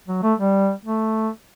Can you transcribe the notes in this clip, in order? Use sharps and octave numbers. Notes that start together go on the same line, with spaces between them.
F#3
A3
G3
A3